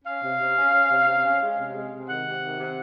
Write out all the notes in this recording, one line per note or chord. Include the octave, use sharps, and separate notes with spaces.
C#4 F5
C3
C3
C#4
C#4
C3
C3
C#4
G#3
C3
G#3
C3
D#3 F#5
C3
D#3
C3